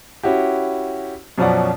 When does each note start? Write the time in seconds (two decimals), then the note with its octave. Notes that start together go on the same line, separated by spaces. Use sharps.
0.23 C#4 E4 F#4 G4
1.38 F#2 B2 F3 C#4 D5 F#5